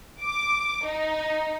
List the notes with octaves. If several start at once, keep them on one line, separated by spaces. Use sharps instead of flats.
D6
D#4